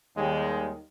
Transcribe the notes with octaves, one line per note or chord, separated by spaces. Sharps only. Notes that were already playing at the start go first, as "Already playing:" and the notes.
D#2 D#3 G3 G#3